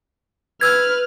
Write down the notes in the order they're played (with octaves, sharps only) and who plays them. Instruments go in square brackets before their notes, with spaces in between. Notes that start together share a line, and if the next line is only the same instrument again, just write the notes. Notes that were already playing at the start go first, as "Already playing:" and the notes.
[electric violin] B4 F6 [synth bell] E6 G#6